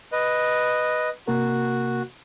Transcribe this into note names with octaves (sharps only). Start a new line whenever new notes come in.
B4 D#5
C3 A#3 F#4 A#4